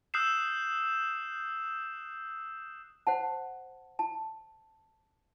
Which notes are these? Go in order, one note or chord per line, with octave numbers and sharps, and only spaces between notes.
D#6 E6 F#6 G6 C7 E7
C5 F#5 A5
A5